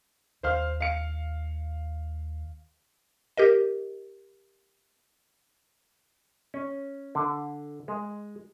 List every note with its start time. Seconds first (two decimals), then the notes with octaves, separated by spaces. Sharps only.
0.43 D#2 C5 F5 F6
0.80 F5 C#7
3.37 G4 A#4 D#5
6.54 C#4
7.15 D3
7.88 G#3